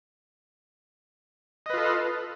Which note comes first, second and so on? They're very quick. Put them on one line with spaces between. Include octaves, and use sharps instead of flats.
D#5 B4 F4 A4